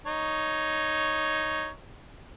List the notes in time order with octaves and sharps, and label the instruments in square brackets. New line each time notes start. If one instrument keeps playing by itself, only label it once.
[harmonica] D#4 C#5